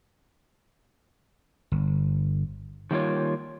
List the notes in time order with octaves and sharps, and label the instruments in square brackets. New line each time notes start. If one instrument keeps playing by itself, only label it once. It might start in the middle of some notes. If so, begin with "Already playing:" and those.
[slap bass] G1
[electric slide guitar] D#3 G3 A#3 C4 F4 C#5